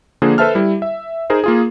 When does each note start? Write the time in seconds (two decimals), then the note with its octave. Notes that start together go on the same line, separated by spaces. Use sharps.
0.22 D3 F3 A#3 D4 G#4 C5
0.38 A4 B4 C5 E5 A5 F6
0.55 G3 E4
0.82 E5
1.30 D#4 G#4 A#4 C5
1.44 A#3 F4 G#4